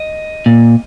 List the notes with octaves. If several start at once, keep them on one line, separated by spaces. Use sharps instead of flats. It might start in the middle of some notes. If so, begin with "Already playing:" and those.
Already playing: D#5
A#2